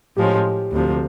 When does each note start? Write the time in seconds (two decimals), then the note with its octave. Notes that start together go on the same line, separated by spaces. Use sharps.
0.16 A2 F3 G#3 C#4 G4
0.71 D2 C3 F3